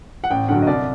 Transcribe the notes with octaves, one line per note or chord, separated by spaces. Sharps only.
F#5
A1 G5
G2 D3 F#3 F#5
D#5
C2 D5